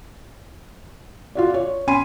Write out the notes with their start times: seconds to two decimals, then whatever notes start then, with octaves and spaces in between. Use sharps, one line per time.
1.35 F4 F#4 D5
1.54 C#5
1.87 C#4 G#5 B5 C6 D#7